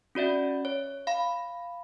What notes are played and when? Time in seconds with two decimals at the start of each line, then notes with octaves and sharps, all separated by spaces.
0.15 C#4 F#4 D5 E5
0.65 C#5
1.07 F5 B5